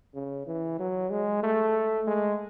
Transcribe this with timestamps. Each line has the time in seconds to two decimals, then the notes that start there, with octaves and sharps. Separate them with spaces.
0.14 C#3
0.47 E3
0.79 F#3
1.10 G#3
1.43 A3
2.07 G#3